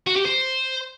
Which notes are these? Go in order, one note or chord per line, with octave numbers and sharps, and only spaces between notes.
F#4
G4
C5